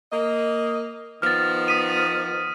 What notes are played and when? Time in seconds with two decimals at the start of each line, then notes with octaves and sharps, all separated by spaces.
0.12 A#3 D#5
1.22 D#3 F3 B3 F6 A6
1.68 D#6 B6 D#7